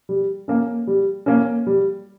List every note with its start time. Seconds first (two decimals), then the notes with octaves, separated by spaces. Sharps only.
0.09 G3
0.48 A#3 C#4
0.87 G3
1.26 A#3 C#4
1.67 G3